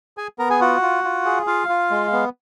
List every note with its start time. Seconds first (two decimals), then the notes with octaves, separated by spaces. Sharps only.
0.17 G#4 G#5
0.39 B3 A#4 A#5
0.50 G#4 G#5
0.60 F4 F#4 F#5
0.82 F4
1.04 F4
1.25 G#4
1.47 F4 F5
1.69 F4
1.90 G#3
2.12 B3